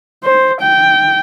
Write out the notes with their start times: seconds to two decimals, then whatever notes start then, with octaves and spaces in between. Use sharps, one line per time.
0.24 C5
0.61 G5